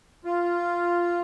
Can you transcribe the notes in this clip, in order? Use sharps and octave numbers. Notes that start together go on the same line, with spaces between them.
F4